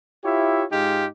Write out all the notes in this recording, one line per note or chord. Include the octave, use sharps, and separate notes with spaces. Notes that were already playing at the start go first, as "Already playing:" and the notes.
E4 F4 G4 C#5 E5
G#2 G#3 D#4 F4 G4